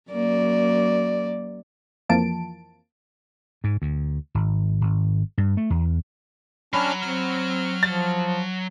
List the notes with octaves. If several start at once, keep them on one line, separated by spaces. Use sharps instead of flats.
F#2 A#3 D5
F2 E3 F3 A#3 A5 D7
G#2
D2
G#1
G#1
G2
A3
E2
F#3 C#4 D4 A#5 B5 F6
C4 F6
F3 A6